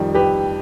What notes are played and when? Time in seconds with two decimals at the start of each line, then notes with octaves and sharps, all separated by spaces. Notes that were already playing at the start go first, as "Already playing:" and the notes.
Already playing: F2 D#3 G3
0.14 G4 B4